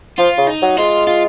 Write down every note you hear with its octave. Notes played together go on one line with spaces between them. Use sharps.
F3 F4
C#3
D#4
F#3
G#3 F4
F4